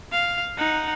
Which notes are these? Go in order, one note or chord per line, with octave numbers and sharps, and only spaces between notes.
F5
D#4 F#5